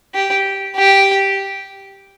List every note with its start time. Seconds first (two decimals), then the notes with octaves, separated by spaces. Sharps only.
0.14 G4
0.76 G4